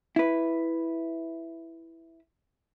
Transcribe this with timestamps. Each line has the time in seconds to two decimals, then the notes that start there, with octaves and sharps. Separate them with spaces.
0.16 E4 B4